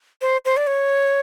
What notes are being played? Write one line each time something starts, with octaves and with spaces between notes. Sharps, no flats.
C5
C5
D5
C#5